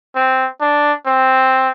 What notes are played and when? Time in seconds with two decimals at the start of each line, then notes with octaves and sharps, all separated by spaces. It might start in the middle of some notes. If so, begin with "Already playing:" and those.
0.15 C4
0.61 D4
1.06 C4